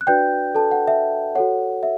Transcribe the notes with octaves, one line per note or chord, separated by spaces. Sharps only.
F#6
D4 F#4 B4 D5 G5 G6
A4 A5
F#5
E5
F#4 A4 C#5 F#5
E5